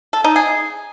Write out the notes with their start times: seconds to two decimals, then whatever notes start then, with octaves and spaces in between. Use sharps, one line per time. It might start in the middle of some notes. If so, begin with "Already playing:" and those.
0.13 A4
0.24 D#4
0.36 G#4